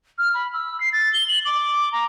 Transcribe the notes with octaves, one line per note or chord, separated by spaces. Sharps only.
F6
B5
E6
C7
A6
G7
F#7
D6
A#5